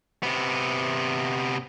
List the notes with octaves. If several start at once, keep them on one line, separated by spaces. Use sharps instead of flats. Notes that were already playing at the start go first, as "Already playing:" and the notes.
C3 B3